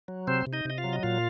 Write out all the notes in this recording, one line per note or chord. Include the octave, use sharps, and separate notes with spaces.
F#3
C3 C4 C5
C3
D#4 D#5
C3 D#5
F4 F5
F#3
D#5
A#2 F4 F5